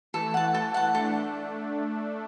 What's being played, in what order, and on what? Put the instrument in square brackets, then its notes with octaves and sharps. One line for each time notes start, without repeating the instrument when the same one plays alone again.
[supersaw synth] E3 A3 [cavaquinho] A4
[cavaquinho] F#5 A5
A4
F#5 A5
[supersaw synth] A3 D4 [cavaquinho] A4